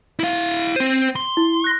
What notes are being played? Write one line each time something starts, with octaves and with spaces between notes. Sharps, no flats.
E4 F5
C4 C5 C7 D#7
C6
E4
F#6 A#6